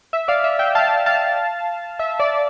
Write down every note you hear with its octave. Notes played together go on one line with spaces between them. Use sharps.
E5
D5 F5
E5
E5 G5
F5 A5
F5 A5
E5
D5